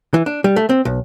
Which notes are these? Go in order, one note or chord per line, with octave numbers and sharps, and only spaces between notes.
E3
D4
G3
A3
C4
B1